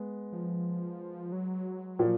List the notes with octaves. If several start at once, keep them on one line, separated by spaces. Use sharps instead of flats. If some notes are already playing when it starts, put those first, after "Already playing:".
Already playing: G#3 B3
F3
F#3
A#2 F3 A#3